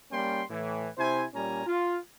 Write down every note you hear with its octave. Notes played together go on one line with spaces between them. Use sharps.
G3 A#3 C#4 G5 C6
A2 E3
C3 E4 C5 G#5
A#2 G3 C#4 G#5 A#5
F4